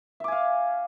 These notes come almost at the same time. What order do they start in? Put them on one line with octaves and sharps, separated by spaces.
E5 D6 G#5 F5